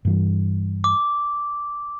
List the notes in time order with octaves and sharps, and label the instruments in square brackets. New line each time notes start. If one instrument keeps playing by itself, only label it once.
[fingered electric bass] G2 E3 G3
[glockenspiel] D6